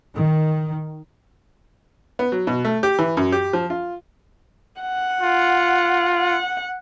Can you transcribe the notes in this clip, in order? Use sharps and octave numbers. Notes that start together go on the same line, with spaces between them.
D#3
B3
F#3
B2
A3
G4
E3
F#2
G4
F3
F4
F#5
F4
F#5